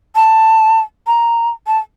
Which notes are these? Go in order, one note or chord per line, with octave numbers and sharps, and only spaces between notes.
A5
A#5
A5